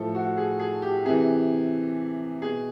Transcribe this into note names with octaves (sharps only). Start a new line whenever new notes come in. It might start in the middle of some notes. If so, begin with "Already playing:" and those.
Already playing: A2 F3 A4
F#4
G#4
G#4
G4
C3 E3 G#4
B2 G#4